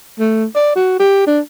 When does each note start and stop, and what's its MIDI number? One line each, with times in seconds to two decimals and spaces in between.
0.19 0.46 57
0.55 0.75 74
0.76 0.96 66
1.00 1.26 67
1.27 1.40 62